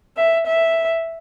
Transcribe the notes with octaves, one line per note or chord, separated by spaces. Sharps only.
E5
E5